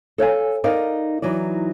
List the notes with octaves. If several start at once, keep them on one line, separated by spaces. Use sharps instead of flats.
A4 C#5 F5 G#5
D#4 A#4 D5 D#5 F5
E3 F#3 D#4 D5